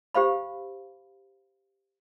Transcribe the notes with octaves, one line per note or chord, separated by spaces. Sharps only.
G4 C5 F5 B5